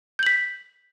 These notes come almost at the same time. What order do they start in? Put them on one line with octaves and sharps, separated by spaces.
G6 F#7 B6